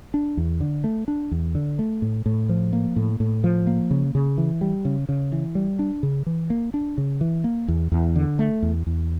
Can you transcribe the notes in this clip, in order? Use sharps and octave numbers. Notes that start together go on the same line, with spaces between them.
D4
E2
D3
A3
D4
E2
D3
A3
A2
A2
F3
A#3
A2
A2
F3
A#3
C#3
C#3
E3
G3
C#3
C#3
E3
G3
D4
C#3
E3
A#3
D4
C#3
E3
A#3
E2
E2
D3
A3
E2
E2